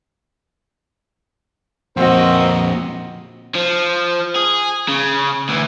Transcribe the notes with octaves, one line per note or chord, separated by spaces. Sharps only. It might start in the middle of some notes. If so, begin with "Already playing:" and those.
F2 A#2 C4 F#4 A#4 D#5
F3
G#4
C#3
D2 E3